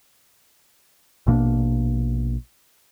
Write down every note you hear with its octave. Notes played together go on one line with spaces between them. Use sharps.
A#1 B2 A#3 D4